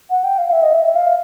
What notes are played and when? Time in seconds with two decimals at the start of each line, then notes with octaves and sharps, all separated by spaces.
0.10 F#5
0.24 G5
0.38 F5
0.49 F5
0.52 E5
0.63 D#5
0.73 E5
0.85 E5
0.95 F5